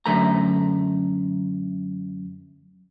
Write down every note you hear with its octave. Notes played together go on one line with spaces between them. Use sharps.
F#2 D3 A3 A#5